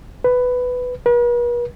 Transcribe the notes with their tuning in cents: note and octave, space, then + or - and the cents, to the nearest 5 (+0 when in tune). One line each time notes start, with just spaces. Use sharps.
B4 +10
B4 -45